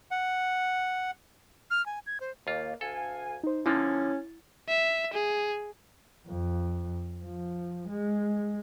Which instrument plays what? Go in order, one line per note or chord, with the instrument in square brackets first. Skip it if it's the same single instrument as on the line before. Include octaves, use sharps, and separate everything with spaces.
[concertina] F#5
[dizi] F6
G#5
G#6
C5
[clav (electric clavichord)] D#2 F4 [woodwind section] A#3
[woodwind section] D2 F5 G#5 [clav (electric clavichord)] A4
[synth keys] D#4 C5
[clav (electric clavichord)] D3 F3 A#3 [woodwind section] C#4 [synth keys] E4 A6
[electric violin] E5
G#4
[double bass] F2
F3
G#3